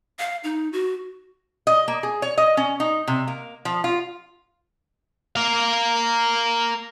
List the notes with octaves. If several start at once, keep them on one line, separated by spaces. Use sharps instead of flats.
F5
D#4
F#4
D#5
A#3
G#4
C#5
D#5
C#4
D#4
C3
A#3
F3
F4
A#4 F5